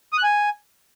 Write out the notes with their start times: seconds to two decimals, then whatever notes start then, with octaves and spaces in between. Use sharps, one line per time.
0.13 D#6
0.18 F#6
0.23 G#5